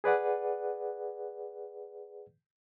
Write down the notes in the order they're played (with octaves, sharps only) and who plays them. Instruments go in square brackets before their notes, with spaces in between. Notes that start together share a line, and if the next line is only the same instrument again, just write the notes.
[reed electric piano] G#4 B4 D5 F#5